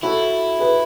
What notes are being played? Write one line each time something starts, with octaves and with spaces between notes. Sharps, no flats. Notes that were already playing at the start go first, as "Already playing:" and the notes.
E4 F#4 A4
G#4 B4